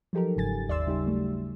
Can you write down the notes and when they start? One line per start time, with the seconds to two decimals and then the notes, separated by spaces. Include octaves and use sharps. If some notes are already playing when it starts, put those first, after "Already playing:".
0.13 F3 F#3 D#4 G4 A4 A#4
0.36 G1 G#2 C#3 G#5 A6
0.69 D#2 D5 E5 C6 E6
0.86 C#3 G3 D#4 G4
1.05 C#3 F#3 A3